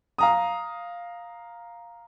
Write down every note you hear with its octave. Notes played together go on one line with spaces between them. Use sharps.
F5 A#5 D#6